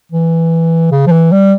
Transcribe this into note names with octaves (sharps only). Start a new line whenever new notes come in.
E3
C#3
F3
E3
G3